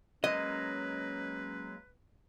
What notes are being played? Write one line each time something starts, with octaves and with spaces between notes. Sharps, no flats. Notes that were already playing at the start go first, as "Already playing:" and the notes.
F#3 G#3 A#3 C#4 B4 D#5